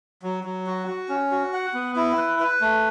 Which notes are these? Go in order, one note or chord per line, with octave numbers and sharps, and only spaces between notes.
F#3
F#3
F#4
F#4
C#4
F#4
F#5
B3
E4
B4
B4
A3